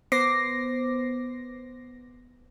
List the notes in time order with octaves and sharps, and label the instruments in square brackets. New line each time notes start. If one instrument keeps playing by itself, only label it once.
[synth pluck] B3 C5 D6 A#6 C7